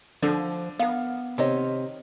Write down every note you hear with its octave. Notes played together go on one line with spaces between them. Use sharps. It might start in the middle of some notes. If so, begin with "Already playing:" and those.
D3 F3
B3 A#4 F5
C3 D#3 C#5 D#5